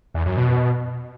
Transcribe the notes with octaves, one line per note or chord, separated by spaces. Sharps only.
E2
F#2
B2